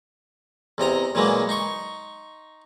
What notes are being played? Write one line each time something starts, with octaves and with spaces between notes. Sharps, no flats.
E2 C3 D#5 A#5
A#2 E3 F#3 G#3 A#3
D#4 C6 C#6